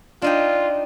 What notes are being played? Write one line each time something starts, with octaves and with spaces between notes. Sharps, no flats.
D4 D#4 F4 G5